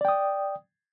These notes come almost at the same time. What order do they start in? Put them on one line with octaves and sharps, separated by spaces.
D5 G5 D#6